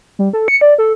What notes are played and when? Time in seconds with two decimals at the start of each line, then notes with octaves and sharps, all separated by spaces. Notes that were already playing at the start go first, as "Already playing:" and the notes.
0.19 G3
0.33 A4
0.48 C#7
0.61 D5
0.78 A4